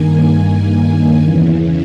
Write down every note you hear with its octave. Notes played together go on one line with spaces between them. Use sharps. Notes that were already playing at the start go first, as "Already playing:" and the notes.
Already playing: G2 D#3 A#3 G#5
G#5
E2 C#3 E3